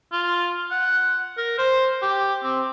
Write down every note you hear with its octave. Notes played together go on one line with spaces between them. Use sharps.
F4
F#5
A#4
C5
G4
C4